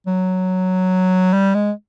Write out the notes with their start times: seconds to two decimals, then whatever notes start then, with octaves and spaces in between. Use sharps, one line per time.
0.07 F#3
1.33 G3
1.55 G#3